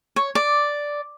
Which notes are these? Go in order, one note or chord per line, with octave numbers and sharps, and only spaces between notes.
C#5
D5